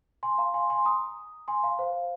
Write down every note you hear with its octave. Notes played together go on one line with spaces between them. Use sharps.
G#5 C6
F5 A#5
G#5 C6
G#5 C6
A#5 D#6
G#5 C6
F5 A#5
C5 F5